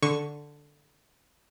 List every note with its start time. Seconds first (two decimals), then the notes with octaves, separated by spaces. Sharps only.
0.02 D3 C#6